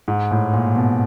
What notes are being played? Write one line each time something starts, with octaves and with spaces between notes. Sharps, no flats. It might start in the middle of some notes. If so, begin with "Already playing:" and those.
G#2
A2
A#2
B2